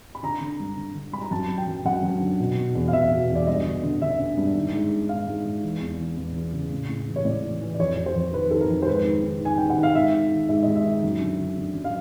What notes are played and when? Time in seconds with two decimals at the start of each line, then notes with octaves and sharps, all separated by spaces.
0.15 B5
0.23 D3 A#5
0.41 D3
0.60 G2
0.77 D3
0.95 D3
1.13 G2 B5
1.22 A#5
1.31 F#2 A5
1.50 F#2
1.58 G5
1.67 F#2
1.85 F#2 F#5
2.03 F#2
2.21 D3
2.40 B2
2.57 B2
2.75 E2
2.88 F5
2.93 E2 E5
3.12 B2
3.30 E2
3.35 D5
3.47 G2 D#5
3.65 D3
3.83 D3
4.01 D3 E5
4.20 D3
4.37 G2
4.55 D#3
4.73 G#2
4.91 D#3
5.09 G#2 F5
5.28 G#2
5.45 G#2
5.63 E3
5.81 E2
5.99 E3
6.17 E2
6.36 E3
6.53 C#3
6.72 A2
6.89 A2
7.07 E3
7.16 C#5
7.25 A2 D5
7.43 E3
7.61 E3
7.74 D5
7.80 F2 C#5
7.97 F2
8.06 C5
8.16 F2
8.33 D#3 B4
8.51 D#3 A4
8.61 A#4
8.69 F2
8.82 C5
8.87 G#2 B4
9.05 D#3
9.23 D#3
9.41 D#3 G#5
9.58 D#3 G5
9.70 F#5
9.77 D#3
9.83 F5
9.95 G#2 E5
10.14 D#3
10.31 D#3
10.49 G#2 E5
10.63 G#2 D#5
10.75 E5
10.85 D#3
11.03 F#2
11.21 D3
11.39 D3
11.57 D3
11.75 F#2
11.84 F5